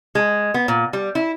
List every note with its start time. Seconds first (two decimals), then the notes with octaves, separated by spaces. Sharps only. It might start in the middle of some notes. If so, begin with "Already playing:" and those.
0.15 G#3
0.54 B3
0.68 A#2
0.93 G3
1.15 E4